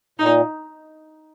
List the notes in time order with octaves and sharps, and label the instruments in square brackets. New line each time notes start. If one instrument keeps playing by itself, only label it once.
[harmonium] A#2 [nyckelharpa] D#4